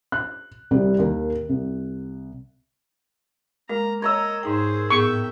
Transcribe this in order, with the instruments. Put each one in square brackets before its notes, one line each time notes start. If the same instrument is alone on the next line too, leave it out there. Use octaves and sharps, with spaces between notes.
[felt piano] F#6
C2 G3 C4
D#2 A#4
C2
[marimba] G#3 [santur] A#3 [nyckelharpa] A#5
[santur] C#5 A#5 E6 [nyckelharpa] D#5
[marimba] G#2 D#4 G5 [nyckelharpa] G#4 C5
[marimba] A2 B3 G#4 [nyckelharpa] E5 G5 [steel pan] C#6